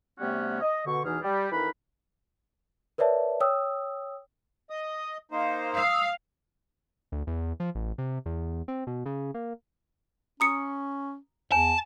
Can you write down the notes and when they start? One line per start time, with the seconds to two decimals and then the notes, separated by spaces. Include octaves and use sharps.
0.19 C3 G3 A3 B3 C#4 F#4
0.61 D#5
0.85 B2 D3 C#6
1.04 E2 B2 E3 D#4 G#4 F6
1.23 G3
1.51 F2 E3 D#4 A#4 B4 B5
2.98 A#4 B4 C#5 D5 E5 A5
3.40 C#5 G5 D#6 E6
4.70 D#5 D#6
5.32 A#3 D#4 C5 F5
5.75 F5 D#6 E6
7.12 D2
7.27 E2
7.60 F3
7.75 A1
7.98 C3
8.26 E2
8.68 C4
8.87 B2
9.06 C#3
9.34 A#3
10.40 C#4 A#5 D#6 C#7
11.52 E2 G#5 A5